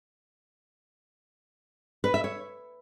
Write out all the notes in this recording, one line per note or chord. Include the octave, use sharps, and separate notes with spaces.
B4
E5
C#5